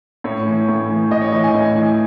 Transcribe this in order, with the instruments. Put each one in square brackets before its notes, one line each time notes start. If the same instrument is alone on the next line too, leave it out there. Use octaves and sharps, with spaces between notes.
[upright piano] A2 C#5
E3
A2
E3
A2 D#5
C#5
E3 D#5
G#5
A2
E3